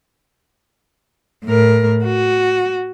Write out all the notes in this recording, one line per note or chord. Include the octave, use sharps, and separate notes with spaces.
A2 A#4
F#4